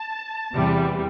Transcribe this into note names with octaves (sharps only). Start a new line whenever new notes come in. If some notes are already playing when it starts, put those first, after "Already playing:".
Already playing: A5
E2 C3 E3 G3